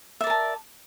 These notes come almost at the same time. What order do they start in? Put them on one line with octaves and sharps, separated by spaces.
E5 D5 A#4 A5